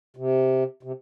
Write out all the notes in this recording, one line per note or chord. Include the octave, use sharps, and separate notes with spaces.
C3
C3